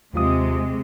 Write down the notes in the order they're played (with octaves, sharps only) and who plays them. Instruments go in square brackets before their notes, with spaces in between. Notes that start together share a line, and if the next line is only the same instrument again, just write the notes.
[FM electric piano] D#2 F4 D#6 [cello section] C3 G#3